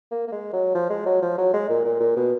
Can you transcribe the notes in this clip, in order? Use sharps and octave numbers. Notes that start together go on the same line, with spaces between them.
A#3
A#3
G#3
F#3
F3
G#3
F#3
F3
F#3
G#3
A#2
A#2
A#2
B2